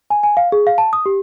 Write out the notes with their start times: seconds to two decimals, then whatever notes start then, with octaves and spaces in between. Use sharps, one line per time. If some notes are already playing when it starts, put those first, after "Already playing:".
0.10 G#5
0.23 G#5
0.37 F5
0.52 G#4
0.67 F5
0.78 A5
0.93 D#6
1.06 G4